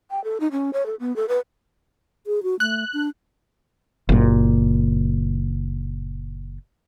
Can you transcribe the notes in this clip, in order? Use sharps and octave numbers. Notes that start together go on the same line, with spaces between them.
G5
A4
D#4
C#4
C#5
A4
B3
A4
B4
G#4
F#4
A3 F#6
D4
F#1 A#2